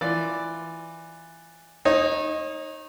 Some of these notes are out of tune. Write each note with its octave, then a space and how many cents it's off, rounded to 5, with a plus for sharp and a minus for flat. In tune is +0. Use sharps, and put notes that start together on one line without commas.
E3 +0 F4 +0 D5 +0
D#4 +0 C#5 -35